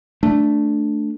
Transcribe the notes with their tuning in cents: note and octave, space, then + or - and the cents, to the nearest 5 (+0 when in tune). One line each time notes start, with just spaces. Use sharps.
A3 +0 D4 +0